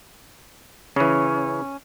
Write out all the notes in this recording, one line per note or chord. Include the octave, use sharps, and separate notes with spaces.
C#3 E3 C#4